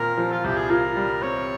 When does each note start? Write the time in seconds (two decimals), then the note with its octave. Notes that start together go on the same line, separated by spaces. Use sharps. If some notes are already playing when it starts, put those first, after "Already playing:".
Already playing: A#2 C4 A#4
0.18 F3
0.32 F4
0.44 C2 G4
0.57 G#4
0.70 F4 A#4
0.96 G3
1.22 C4 C#5